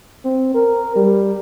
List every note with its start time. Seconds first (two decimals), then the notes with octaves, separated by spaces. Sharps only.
0.25 C4
0.54 A#4
0.95 G3